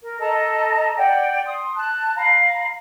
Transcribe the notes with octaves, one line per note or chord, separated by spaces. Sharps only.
A#4
A4 D#5 A5 A#5
D5 F#5 G5
C6 D#6
A5 F#6
F5 A#5 B5